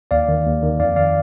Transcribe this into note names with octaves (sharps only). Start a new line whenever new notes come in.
D#2 D5 F5
D#3
D#2
D#3
F2 D5 F5
D#3 D5 F5